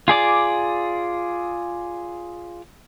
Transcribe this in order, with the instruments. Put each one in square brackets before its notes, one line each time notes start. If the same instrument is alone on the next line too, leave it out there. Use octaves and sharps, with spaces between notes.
[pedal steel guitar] F4 G#4 D5 D6